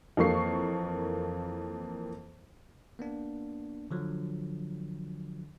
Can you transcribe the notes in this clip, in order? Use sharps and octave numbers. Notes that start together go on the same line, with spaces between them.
F2 E3 A#3 A4 C#6 C7
A#3 B3 D4
D3 F3 F#3